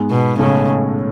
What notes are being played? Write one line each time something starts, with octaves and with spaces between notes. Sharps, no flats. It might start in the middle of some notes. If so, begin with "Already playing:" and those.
Already playing: G#2 G#3 B3
B2
B1 A2 C#3 G#3 C#4